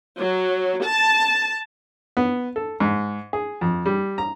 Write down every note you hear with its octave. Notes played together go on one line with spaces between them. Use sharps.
F#3
A5
B3
A4
G#2
G#4
F2
G3
A#5